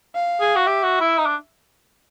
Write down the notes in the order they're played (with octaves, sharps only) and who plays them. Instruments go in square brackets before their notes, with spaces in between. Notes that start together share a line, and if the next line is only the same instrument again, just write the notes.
[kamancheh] F5
[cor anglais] G#4
F#4
[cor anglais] G4 [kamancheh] E5
[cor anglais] F#4
E4
D#4
D4